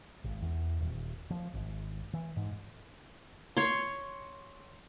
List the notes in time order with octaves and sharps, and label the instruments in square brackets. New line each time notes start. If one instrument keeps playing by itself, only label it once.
[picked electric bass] G#1
E2
D#1
F3
G#1
E3
G#2
[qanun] C#5 C6